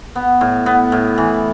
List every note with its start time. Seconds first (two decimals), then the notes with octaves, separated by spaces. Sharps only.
0.15 B3
0.41 A2
0.66 B3
0.92 A2
1.18 E3